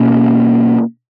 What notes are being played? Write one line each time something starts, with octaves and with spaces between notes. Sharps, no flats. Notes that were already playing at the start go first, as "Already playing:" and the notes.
Already playing: B2 A#3 C#4